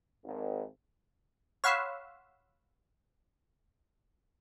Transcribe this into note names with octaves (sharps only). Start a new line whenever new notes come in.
G#1
C#5 F5 F#5 B5 C6 E6